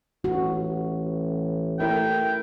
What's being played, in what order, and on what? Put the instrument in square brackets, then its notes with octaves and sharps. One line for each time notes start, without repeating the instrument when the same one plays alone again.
[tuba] A1 [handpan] F#4
[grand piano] A3 E4 A#4 [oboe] G5